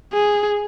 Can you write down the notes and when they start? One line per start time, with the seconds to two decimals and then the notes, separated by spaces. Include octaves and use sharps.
0.13 G#4